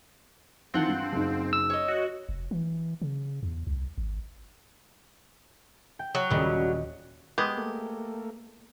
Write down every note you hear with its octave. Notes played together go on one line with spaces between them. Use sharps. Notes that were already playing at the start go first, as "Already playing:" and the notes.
D#3 E3 C4 F4 F#5 A5
G2
F#1 D#4
E6
C#5 D#5
F#4
F1
E3
C#3
E2
C2
G#1
G5
F#3
D#1 C#3 G3 D#5
G#3 B3 G4 G#4
A3 A#3